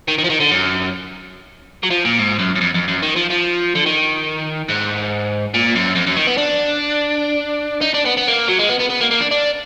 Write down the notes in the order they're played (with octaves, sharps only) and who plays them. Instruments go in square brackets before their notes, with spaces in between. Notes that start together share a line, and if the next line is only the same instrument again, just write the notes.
[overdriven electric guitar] D#3
D#3
F3
D#3
D3
F#2
F#3
F3
A#2
G#2
F#2
F#2
F2
F2
F#2
D#3
F3
F3
D3
D#3
G#2
A#2
F#2
F2
F#2
D#3
B3
D4
D#4
D4
B3
B3
A#3
F#3
G#3
B3
B3
B3
A#3
A#3
D4
D4